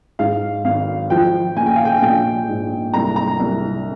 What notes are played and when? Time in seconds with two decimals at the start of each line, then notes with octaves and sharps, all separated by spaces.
0.19 G#2 F5
0.64 G#1 F5
1.10 F3 G5
1.56 A#2 G#5
1.66 G5
1.76 F5
1.85 G5
2.02 A#1 G5
2.48 G#2
2.94 C2 A#5
3.16 A#5
3.40 C2